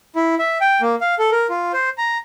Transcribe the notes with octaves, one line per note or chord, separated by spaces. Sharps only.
E4
E5
G5
A#3
F5
A4
A#4
F4
C5
A#5